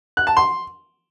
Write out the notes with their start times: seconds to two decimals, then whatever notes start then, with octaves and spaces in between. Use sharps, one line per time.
0.17 F#6
0.27 A5
0.37 C6